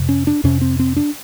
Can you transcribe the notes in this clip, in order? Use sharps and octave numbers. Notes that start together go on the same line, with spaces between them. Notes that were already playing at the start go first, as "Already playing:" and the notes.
Already playing: F2 C3
C#4
D4
F2 C3 C#4
C4
C4
D4